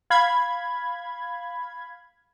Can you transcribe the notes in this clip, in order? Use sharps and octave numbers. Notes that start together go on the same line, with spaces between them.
F5 B5 G#6